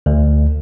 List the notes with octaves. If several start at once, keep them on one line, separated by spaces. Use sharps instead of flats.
D2